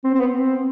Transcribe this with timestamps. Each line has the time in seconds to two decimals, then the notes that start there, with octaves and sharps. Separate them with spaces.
0.04 C4
0.14 C4
0.20 B3
0.36 C4